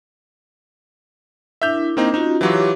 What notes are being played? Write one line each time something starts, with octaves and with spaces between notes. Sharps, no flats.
D4 E4 A#4 E5 G6
A#3 C4 D4 D#4 C5
C#4 D#4 F4 F#4
E3 F#3 F4 G4 C#5 D6